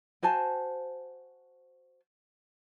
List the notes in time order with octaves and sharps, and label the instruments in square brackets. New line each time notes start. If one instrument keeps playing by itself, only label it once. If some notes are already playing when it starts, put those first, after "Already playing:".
[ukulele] F#4 C5 G#5 A5